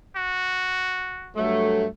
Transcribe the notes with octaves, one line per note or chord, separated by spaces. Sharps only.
F#4
G2 F#3 A3